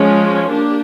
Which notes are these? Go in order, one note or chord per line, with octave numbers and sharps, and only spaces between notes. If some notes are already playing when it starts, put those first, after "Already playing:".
Already playing: F3 G#3 C#4
A#3 D4 G4